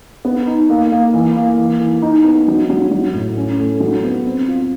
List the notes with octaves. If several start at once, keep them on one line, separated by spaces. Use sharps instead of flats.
B3
D#4
A#3
A#3
E3
A#3
E3
E3
D#4
B3
F#3
F#3
F#3
A2
C#4
A3
F#3
B3
C4
F4